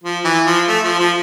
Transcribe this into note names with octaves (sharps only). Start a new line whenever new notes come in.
F3
E3
F3
A3
F3
F3